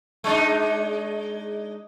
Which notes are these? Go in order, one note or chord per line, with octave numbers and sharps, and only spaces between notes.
G#3 D4 D#4